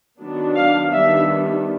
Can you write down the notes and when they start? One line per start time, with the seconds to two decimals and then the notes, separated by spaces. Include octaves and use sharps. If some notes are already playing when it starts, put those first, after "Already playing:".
0.21 D#3 F#3 B3 D4
0.57 F5
0.93 D#3 G3 B3 D4 E5